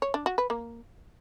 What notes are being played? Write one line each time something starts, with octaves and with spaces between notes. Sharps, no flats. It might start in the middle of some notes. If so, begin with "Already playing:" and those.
C#5
D4
F#4
B4
A#3